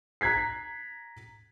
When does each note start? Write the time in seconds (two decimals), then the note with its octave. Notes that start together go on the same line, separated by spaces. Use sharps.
0.21 A#5 F#6 G#6 B6 C7